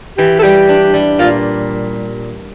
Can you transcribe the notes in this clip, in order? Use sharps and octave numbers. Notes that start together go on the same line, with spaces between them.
E3 G4
A4
G3 G4
D4
G3
A#2 F4